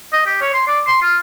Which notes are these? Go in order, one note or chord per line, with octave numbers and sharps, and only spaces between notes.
D#5
G4
C#5
C6
D5
C6
F4